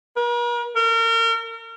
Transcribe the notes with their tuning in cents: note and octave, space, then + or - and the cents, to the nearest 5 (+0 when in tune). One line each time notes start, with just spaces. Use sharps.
A#4 +45
A#4 -35